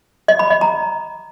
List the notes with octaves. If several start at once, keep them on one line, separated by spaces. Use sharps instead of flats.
D#5
B5
D#5
A#5